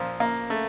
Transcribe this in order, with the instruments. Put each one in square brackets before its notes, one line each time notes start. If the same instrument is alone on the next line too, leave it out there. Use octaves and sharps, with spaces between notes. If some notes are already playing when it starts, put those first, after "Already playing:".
Already playing: [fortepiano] A#2 F3
A#3
A3